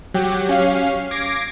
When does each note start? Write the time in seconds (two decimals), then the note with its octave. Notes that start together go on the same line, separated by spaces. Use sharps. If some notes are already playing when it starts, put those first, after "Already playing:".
0.14 F#3 G4
0.49 C#4 F5
1.11 D6 G#6 A#6 C7 D7